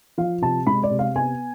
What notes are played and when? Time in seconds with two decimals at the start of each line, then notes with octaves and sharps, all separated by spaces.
0.18 F3 F5
0.42 C3 A5
0.67 G#3 B5
0.83 D5
0.91 C3
0.99 F5
1.16 B3 G#5